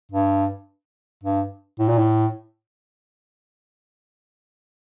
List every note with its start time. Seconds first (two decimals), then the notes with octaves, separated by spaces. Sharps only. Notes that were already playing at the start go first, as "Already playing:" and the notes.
0.12 G2
1.24 G2
1.79 A2
1.89 A#2
1.98 A2